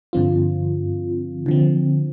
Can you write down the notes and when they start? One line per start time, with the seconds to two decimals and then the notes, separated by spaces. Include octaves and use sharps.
0.13 G2 D3 F3 C4 F4
1.46 D3 F3 C4